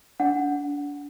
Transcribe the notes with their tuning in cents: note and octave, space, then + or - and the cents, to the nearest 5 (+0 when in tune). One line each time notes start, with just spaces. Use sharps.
D4 -30 F#5 +0